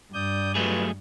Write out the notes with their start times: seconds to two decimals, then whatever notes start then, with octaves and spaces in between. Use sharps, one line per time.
0.14 G2 D5 D#6 G6
0.55 F#3 G3 A3 F4 G#4 B4